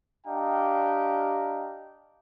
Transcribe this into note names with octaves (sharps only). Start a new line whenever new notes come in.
D4 G4 D#5 F5 G5 A#5